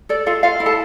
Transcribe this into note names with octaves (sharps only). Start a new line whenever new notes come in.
A4 D5
F4 A4 F5
F4 A4 F5
E4
A4 A5